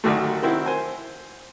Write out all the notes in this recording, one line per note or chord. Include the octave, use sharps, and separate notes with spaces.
A1 D2 D3 D#3 F#3 A3
D#3 C4 E4 F#4
C5 G#5